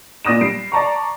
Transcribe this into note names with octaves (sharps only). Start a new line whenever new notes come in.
A#2 D5 D#6 A#6 E7
G3 C7 D7
D5 A5 A#5 C#6